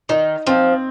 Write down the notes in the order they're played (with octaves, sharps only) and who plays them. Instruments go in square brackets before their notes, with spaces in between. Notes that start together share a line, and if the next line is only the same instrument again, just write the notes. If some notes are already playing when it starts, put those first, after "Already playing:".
[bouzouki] D#3 [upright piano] D#4
[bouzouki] F3 [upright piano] C4